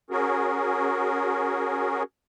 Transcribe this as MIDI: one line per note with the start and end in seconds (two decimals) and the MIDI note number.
0.10 2.03 61
0.10 2.03 66
0.10 2.03 68
0.10 2.03 70